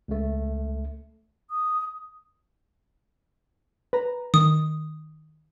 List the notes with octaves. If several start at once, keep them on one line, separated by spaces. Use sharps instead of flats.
C#2 A3
D#6
B4 A#5
D#3 D#6